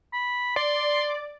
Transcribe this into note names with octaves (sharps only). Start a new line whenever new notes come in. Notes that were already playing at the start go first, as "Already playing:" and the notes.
B5
D5 C6